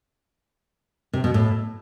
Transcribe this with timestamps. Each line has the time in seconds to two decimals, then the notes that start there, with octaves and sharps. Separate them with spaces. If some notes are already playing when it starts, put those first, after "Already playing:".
1.13 C3
1.24 B2
1.34 A2